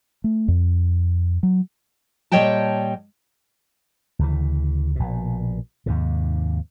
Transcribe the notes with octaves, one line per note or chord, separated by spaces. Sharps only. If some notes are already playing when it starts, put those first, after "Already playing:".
A3
F2
F#3
A#2 G3 C#5 D#5 G5 A5
D2 C#3 E3
A#1 B2
D#2 G#2 C3